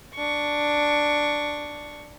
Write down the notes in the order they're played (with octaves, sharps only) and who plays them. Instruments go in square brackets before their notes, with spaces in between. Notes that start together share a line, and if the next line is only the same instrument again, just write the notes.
[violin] D4 C#6